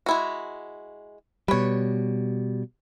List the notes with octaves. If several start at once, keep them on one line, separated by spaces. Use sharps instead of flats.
G#3 E4 F#4
B2 G3 B4 C#5